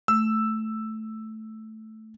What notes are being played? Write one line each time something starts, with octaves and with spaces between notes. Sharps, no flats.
A3 E6